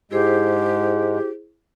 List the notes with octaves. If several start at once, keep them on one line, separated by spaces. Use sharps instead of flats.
G#2 G#3 E4 G4 G#4 C5